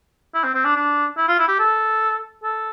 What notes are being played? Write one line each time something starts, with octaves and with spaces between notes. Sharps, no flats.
E4
C4
C4
D4
D4
E4
F4
E4
G4
A4
A4